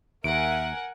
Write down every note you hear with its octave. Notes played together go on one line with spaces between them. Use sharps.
D#2 A#4 E5 F#5 G#5 D7